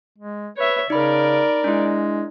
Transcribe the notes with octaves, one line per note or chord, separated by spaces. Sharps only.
G#3
B4 C#5 E5
C#3 D#4 A#4 D5 B5
G#3 D4 E4